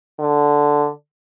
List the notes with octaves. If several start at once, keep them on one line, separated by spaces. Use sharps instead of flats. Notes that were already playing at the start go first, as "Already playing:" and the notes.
D3